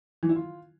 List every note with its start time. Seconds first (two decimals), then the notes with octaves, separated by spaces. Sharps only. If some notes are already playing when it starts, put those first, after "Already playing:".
0.23 E3
0.29 E4
0.36 F4